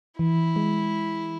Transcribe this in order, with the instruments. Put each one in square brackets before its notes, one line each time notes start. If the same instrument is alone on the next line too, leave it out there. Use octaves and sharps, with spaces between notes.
[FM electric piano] E3 [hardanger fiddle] E4
[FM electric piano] G#3